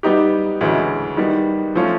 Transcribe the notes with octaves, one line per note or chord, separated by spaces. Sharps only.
G3 B3 D#4 G4
D2 C#3 E3 G#3
D#3 G3 B3
F3 A3 C#4 F4